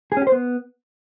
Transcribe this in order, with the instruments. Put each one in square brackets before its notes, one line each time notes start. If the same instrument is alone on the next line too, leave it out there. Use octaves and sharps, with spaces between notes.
[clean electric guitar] G#4
C#4
G4
C5
B3